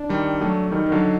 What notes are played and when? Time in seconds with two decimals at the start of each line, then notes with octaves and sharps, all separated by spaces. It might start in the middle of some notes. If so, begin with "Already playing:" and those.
Already playing: D4
0.09 D#3 G3
0.41 F#3 A3
0.71 D#3 G3 D#4
0.86 D#3
0.92 D3 F#3